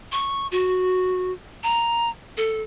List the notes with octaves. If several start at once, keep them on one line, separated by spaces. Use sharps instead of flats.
C#6
F#4
A#5
A4